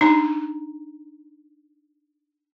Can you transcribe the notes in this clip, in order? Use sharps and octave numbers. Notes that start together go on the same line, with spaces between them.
D4 D#4 A#5